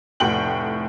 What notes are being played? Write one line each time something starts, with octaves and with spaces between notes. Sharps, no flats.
F1 A2 F#5 G5 F#7